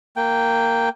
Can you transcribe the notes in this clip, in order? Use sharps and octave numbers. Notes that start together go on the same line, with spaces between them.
A#3 G5